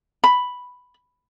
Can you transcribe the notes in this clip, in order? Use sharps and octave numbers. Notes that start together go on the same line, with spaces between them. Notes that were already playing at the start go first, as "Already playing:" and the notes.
B5